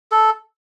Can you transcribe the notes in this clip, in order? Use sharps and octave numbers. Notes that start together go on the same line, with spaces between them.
A4